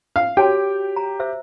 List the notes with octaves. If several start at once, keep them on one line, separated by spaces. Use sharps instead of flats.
F5
F#4 G4 C#5 G5 A5
A#5
C5 E5 E6